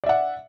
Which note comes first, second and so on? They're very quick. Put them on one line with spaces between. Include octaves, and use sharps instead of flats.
D5 E5 F#5